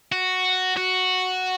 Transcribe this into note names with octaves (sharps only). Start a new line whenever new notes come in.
F#4
F#4